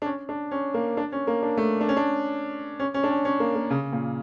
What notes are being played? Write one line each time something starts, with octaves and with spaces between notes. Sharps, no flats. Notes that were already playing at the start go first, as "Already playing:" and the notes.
D4
C#4
D4
C#4
A#3
D4
C#4
A#3
D4
A3
D4
C#4
D4
C#4
C#4
D4
C#4
C#4
A#3
A#3
C#3
A#2